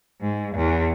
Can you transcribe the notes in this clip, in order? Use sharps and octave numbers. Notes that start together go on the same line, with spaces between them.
G#2
E2